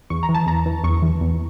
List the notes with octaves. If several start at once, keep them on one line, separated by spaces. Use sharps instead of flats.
E2 C#6
A#5
E3
A5
E2 A#5
E3
E2 C#6
E3
E2